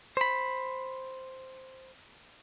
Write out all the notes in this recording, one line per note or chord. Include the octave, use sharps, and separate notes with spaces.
C5 B5